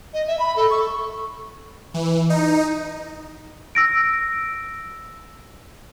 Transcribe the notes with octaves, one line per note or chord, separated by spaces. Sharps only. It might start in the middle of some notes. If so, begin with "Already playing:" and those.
D#5
E5
B5
A4
C#6
E3
D#4
E6 A#6 D7